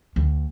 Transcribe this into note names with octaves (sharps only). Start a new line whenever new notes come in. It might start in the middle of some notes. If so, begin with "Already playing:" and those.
D2